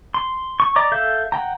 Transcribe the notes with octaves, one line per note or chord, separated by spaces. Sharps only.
C6
C#6
D5 D#5 A#5 D6
A4 E5 F5 G6
F#5 G5 A#5